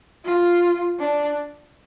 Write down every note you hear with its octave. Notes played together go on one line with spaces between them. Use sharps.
F4
D4